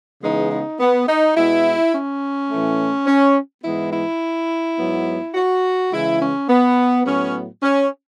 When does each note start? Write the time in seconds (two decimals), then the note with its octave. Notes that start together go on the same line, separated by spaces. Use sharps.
0.22 C#3 E3 G#3 B3 D#4
0.51 D#4
0.80 B3
1.07 D#4
1.36 B2 G#3 B3 E4
1.93 C#4
2.51 A2 E3 A3
3.07 C#4
3.64 G#2 E3 G#3 B3 E4
3.93 E4
4.78 G#2 F#3 B3
5.35 F#4
5.92 C#3 E3 G#3 E4
6.21 C#4
6.49 B3
7.06 A2 F#3 B3 C#4
7.63 C#4